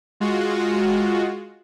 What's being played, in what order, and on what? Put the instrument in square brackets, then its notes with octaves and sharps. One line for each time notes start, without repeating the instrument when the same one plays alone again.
[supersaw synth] G#3 F4 F#4